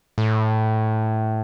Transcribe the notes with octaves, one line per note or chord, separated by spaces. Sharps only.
A2